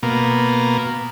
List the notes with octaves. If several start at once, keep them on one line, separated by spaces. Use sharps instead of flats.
B2 A#3